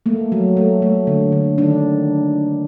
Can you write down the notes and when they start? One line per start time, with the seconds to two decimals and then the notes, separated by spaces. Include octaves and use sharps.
0.06 A3 A#3
0.32 F#3
0.57 A3
0.82 A3
1.07 D3
1.32 D3
1.58 D#3 D4